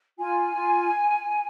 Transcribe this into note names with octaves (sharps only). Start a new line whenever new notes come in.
F4 G#5
F4